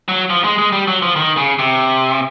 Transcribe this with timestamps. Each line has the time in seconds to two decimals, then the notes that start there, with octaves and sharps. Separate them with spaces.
0.08 F#3
0.30 F3
0.44 G#3
0.58 G#3
0.72 G3
0.87 F#3
1.02 F3
1.16 D#3
1.37 C#3
1.59 C3